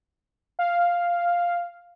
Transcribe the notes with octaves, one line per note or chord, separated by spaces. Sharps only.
F5